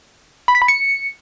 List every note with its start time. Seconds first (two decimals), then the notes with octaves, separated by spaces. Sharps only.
0.48 B5
0.55 B6
0.62 B5
0.68 C#7